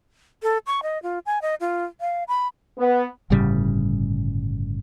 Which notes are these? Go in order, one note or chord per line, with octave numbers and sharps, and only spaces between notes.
A4
C#6
D#5
F4
G#5
D#5
F4
F5
B5
B3
G1 A2 C#3 G3